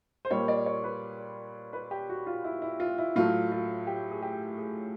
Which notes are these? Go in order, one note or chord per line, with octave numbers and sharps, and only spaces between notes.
C5
A#2 G3 A#3 C#5
D5
C#5
B4
B4
G4
F#4
F4
E4
E4
F4
E4
A2 F#3 A3 F4
F4
G4
G#4
G4
G#4